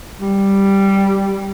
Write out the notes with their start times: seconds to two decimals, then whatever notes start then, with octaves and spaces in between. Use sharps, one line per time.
0.20 G3